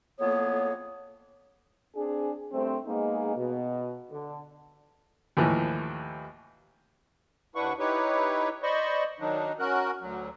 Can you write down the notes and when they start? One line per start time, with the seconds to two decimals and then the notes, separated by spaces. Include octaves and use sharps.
0.20 F2 A2 A#3 B3 G#4 C#5
1.95 C4 D4 G#4
2.52 G2 A3 C4
2.86 G#3 A#3 B3 D#4 G#4
3.36 B2
4.10 D3
5.37 D#2 A2 E3 F3
7.55 D#2 D4 E4 B4 F#5 C#6
7.79 D#4 E4 G4 B4 C#5
8.63 C5 D5 D#5 B5 C#6
9.20 D#3 F#3 D4 D#4
9.59 C#4 F#4 A#4 F#6
10.01 D2 F#3